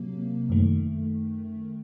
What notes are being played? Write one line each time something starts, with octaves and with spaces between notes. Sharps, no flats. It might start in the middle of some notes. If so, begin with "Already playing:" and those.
Already playing: C3 F#3 A#3
F#2 D#3 A3